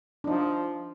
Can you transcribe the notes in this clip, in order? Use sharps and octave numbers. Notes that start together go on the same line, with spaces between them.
D4
F3 D#4